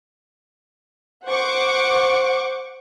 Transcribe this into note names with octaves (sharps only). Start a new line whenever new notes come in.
C5 F#5 C#6 D6